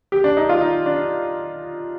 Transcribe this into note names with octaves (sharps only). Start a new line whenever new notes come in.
G4
D4
D#4
F4
D#4
D4